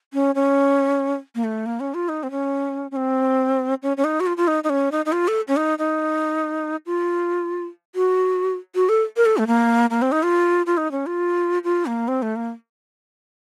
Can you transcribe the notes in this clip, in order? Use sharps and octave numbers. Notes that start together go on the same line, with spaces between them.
C#4
C#4
A#3
A3
A#3
C#4
F4
D#4
C4
C#4
C#4
C4
C#4
C#4
D#4
F#4
F4
F4
D#4
D#4
C#4
D#4
D#4
F4
A4
C#4
D#4
D#4
F4
F#4
F#4
A4
A#4
A4
A3
A#3
A#3
C4
D#4
F4
F4
D#4
C#4
F4
F4
A#3
C4
A3
A#3